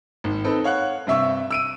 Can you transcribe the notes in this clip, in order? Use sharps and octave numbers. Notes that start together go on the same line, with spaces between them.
G#1
C4 D#4 A4 B4
C#5 F5 F#5 F#6
G2 C3 E5 C#6 E6
E6 D7 D#7